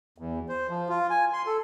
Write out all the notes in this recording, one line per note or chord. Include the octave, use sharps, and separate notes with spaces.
E2
C5
F3
F4
G#5
C6
A4